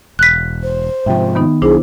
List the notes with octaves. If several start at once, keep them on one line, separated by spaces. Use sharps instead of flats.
E1 F#6 B6
C5
G#2 C3 F3 E5 G5
D#3 B3 D#4
B1 B2 D4 E4 G#4 C5